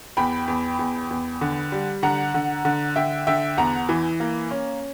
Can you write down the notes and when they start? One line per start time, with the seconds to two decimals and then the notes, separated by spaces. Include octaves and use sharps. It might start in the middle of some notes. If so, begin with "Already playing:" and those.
0.17 E2 G5 B5
0.48 E2
0.79 E2
1.11 E2
1.41 D3
1.72 G3
2.03 D3 F#5 A#5
2.34 D3
2.65 D3
2.96 D3 E5 G5
3.27 D3 E5 G5
3.58 E2 F#5 A#5
3.89 E3
4.20 A#3
4.51 C#4